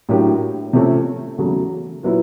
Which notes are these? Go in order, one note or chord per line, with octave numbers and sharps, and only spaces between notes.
A2 F#3 A#3 D4 G4
C3 F3 A3 C#4
E2 C#3 F#3 A3
A#2 F#3 B3 E4